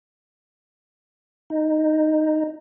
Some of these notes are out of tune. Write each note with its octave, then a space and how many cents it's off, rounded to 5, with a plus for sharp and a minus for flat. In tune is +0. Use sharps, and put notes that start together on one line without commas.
D#4 -5